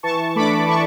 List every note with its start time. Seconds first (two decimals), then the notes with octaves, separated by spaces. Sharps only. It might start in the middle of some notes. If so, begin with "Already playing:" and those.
0.03 E3 A5 C#6
0.36 A3 D4 B5 D6
0.68 E3 A5 C#6